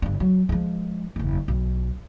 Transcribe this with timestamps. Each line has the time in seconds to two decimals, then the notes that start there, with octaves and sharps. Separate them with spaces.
0.02 G1 D4
0.20 F#3
0.49 F3 G#3
1.16 F#1 E2
1.48 B1